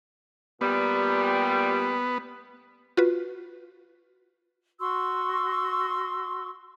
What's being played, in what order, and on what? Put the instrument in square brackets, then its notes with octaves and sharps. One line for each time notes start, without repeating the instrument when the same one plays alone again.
[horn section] A#2 G3 [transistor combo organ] B3
[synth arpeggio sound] F4 F#4 B4
[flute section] F#4 C6 C#6 E6